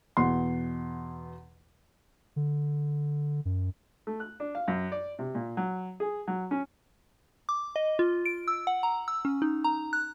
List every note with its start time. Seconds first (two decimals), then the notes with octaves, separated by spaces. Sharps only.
0.17 E2 B2 F#5 C6
2.36 D3
3.45 F#2
4.07 A3
4.20 F#6
4.40 D4
4.55 F5
4.68 F#2
4.92 D5
5.19 C3
5.35 A#2
5.57 F#3
6.00 G#4
6.28 F#3
6.51 C#4
7.49 D6
7.76 D#5
7.99 F4
8.26 D7
8.48 E6
8.67 F#5
8.83 A#5
9.08 E6
9.25 C#4
9.42 D#4
9.64 A#5
9.93 F#6